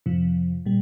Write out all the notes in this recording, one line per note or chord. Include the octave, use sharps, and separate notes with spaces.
F2 C3 F3
A#2 G3